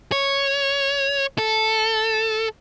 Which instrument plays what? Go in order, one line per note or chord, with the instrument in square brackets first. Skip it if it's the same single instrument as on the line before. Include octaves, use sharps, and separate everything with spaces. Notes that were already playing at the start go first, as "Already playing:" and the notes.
[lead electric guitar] C#5
A4